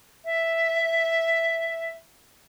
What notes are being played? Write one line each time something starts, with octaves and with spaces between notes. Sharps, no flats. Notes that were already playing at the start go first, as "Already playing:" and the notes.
E5